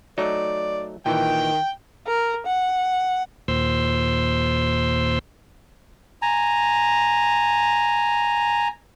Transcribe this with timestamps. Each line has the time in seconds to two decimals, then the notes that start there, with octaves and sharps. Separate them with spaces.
0.18 F#3 A3 D#4 D5
1.06 A#2 D#3 E3 G5
2.07 A#4
2.46 F#5
3.48 D#2 A#2 C5 C6 E6
6.22 G#5 A#5